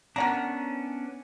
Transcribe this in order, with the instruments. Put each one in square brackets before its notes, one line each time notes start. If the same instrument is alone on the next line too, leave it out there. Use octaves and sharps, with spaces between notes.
[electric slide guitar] B3 C#4 D4 [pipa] A#4 F#5 A#5